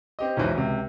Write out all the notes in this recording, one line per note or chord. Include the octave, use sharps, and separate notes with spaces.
C4 G4 D#5
B1 E2 G#2 E3 C5
C#2 C3